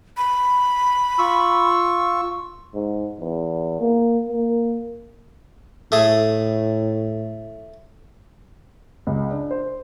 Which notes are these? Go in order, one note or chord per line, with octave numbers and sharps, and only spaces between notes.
B5
F4 C#6 E6
G#2
E2
A#3
A#3
A2 A3 G#4
C#2
D4
C5